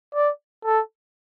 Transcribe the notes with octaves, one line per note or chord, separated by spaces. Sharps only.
D5
A4